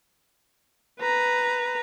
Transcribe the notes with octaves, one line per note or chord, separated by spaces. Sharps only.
B4 A#5